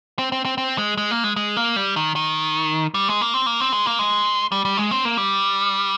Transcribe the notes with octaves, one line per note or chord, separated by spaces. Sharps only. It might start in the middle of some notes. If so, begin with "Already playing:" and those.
C4
C4
C4
C4
G#3
G#3
A#3
G#3
G#3
A#3
G3
D#3
D#3
G3
G#3
A#3
C4
A#3
C4
G#3
A#3
G#3
G3
G3
G#3
C4
A#3
G3